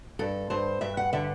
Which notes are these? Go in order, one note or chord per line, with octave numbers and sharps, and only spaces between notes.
G2 A4
G2 C5
G2 E5
F#5
D3 E5